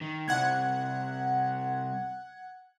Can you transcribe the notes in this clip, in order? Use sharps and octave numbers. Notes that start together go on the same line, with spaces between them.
D#3
C2 F#5 F#6 G#6